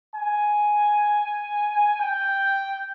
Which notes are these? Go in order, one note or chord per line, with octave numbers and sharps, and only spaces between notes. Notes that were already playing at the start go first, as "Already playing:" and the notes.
G#5
G5